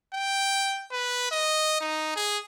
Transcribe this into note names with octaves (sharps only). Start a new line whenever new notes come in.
G5
B4
D#5
D#4
G#4